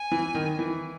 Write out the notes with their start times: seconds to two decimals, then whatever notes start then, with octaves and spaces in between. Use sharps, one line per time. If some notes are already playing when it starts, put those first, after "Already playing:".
Already playing: G#5
0.12 E3
0.35 D#3
0.59 E3